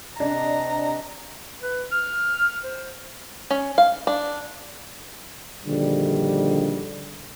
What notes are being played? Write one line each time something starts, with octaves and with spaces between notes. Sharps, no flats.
C3 D4 D#5 A#5
B4
F6
C5
C#4
F5
D4
A#1 D3 D#3 G3